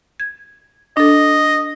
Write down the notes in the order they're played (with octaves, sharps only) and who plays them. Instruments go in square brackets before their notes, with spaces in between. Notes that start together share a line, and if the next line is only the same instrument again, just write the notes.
[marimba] G#6
[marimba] D4 A4 [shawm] D#5